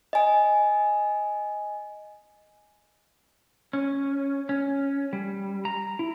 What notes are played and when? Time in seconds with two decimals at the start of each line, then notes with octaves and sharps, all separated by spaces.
0.13 D#5 G#5
3.73 C#4
4.49 C#4
5.13 G3
5.65 A#5
5.99 E4